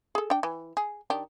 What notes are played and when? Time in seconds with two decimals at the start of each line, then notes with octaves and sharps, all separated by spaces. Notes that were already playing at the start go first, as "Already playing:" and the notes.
0.15 G#4 A4
0.30 D4 G5
0.43 E3
0.77 G#4
1.10 D#3 D4 G4